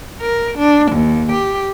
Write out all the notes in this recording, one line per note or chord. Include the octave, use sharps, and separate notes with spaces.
A#4
D4
D#2
G4